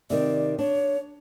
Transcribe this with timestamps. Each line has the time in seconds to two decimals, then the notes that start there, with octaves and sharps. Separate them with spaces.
0.10 C3 D#3 D5
0.59 D4 C#5